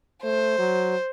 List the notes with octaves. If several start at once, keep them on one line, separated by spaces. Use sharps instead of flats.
A3 C5
F#3